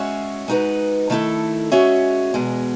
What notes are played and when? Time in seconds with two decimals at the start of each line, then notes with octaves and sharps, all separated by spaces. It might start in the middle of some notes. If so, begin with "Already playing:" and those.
Already playing: G#3 C#4 F#4 C#5 E5
0.48 G#3 D#4 F#4 B4
1.10 D#3 A3 E4 A4
1.72 G#3 C#4 F#4 C#5 E5
2.34 E2 B2 G#3